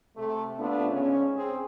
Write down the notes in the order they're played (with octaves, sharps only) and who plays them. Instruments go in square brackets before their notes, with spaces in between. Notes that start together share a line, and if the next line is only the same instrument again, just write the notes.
[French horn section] C3 A3
C3 A3 B3 D4 F4
G#2 C#3 C#4
C4 G#4